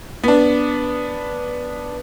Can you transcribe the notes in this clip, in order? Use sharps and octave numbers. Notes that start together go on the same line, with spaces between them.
B3 D4